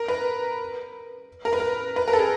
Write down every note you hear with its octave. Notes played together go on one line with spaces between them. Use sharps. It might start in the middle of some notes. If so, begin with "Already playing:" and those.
Already playing: A#4
B4
A#4
B4
A#4
B4
A#4
A4
G#4